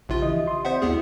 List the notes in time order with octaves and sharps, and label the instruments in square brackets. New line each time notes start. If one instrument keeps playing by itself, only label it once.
[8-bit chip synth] A#1 F4 [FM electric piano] C#3 [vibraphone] G4 E5
[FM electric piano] E3 D#5
C6 D#6
[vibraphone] C4 D5 [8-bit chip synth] C5 E5 F#5
[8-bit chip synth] D#2 B3 G#4 [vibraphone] C#4 E4 F#4